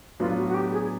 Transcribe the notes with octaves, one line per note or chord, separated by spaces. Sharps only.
A2 F#3 B3 D4 F4
F#4
F#4
G4
G#4